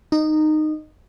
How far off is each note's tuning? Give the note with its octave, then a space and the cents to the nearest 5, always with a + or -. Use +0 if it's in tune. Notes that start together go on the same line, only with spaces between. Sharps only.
D#4 -15